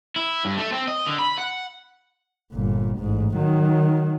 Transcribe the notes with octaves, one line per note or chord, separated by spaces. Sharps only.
E4
G2
A3
C4
D#5
D3
B5
F#5
G1 A#2
A1 G#2
D#3 F#3